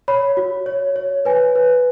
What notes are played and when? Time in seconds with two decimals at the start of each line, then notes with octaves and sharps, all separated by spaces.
0.08 C#5 B5
0.37 F#4
0.66 C#5
0.96 C#5
1.25 B4 G#5
1.55 B4